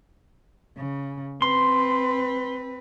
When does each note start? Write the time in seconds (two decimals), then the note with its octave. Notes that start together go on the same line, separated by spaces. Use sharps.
0.78 C#3
1.42 C4 B4 C6